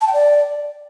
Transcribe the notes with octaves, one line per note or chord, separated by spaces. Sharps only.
A5
G5
D5